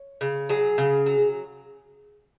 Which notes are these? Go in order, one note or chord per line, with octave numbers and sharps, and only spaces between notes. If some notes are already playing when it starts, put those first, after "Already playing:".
Already playing: C#5
C#3
F#3 G#4
C#3
F#3